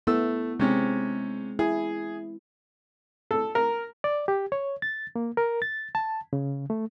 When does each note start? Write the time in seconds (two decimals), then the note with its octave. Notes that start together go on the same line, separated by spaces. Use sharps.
0.07 A3 B3 E4 E6
0.60 C3 G#3 C4 C#4
1.59 E4 G#4
3.31 A4
3.55 A#4
4.04 D5
4.28 G4
4.52 C#5
4.82 A6
5.16 A#3
5.37 A#4
5.62 A6
5.95 A5
6.33 C#3
6.70 A3